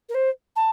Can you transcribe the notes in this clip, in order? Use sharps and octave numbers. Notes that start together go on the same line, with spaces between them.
A#4
C5
A5